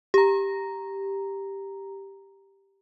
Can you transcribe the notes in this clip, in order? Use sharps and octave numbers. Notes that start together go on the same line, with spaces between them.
G4 A#5